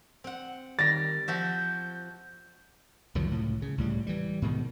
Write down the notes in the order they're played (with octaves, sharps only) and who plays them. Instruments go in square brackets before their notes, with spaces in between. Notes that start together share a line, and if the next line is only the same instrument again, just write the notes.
[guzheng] C4 F#5
[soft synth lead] D#3 [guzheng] G3 [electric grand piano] A6 A#6
[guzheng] F3 F#4 E5 [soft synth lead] G6
[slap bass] C2 F2 D#3 F#3
C#2 A2
C#3
C#2 A2 G3
E3 G3
G#2 B2 D#3